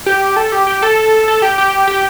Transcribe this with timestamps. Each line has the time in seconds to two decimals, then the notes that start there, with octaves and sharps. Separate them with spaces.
0.06 G4
0.36 A4
0.52 G4
0.67 G4
0.82 A4
1.28 A4
1.42 G4
1.58 G4
1.87 G4